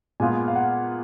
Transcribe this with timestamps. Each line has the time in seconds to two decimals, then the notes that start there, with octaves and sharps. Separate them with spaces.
0.20 A#2 G#3 B3 F4 G#5
0.48 F5
0.56 F#5